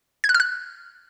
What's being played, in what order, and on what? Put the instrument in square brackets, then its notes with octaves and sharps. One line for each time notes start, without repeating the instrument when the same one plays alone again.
[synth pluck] G#6
F#6
F6
F#6